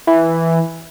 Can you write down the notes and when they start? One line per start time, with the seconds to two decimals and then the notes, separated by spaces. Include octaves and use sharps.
0.07 E3